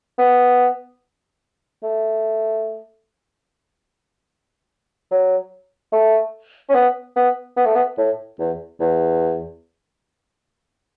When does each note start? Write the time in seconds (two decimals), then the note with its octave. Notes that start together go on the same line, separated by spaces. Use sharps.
0.19 B3
1.83 A3
5.11 F#3
5.92 A3
6.69 C#4
6.75 B3
7.16 B3
7.57 B3
7.66 A3
7.75 B3
7.98 A2
8.39 E2
8.80 E2